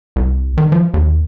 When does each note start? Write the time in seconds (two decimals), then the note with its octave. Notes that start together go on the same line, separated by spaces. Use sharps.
0.16 C2
0.58 D#3
0.72 F3
0.94 D#2